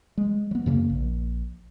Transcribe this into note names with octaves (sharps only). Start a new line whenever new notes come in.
G#3
F#3 B3
F#2 C#3 A#3
A#1